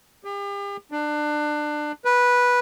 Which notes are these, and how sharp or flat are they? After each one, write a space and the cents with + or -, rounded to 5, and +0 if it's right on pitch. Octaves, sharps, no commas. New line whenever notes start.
G4 +40
D4 +25
B4 -10